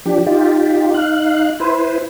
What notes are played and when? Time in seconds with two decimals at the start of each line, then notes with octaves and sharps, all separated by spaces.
0.06 F3 D4 G4
0.26 D#4 F4 G4
0.94 D#4 F5 F#6
1.60 E4 B4 C5